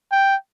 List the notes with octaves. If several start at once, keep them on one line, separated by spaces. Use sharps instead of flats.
G5